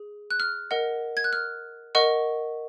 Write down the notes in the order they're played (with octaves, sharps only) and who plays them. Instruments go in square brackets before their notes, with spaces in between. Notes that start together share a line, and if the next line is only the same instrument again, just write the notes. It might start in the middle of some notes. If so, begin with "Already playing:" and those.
Already playing: [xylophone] G#4
F#6
F6
A#4 D#5 F#5
G#6
F#6
F6
A#4 D#5 F#5 C#6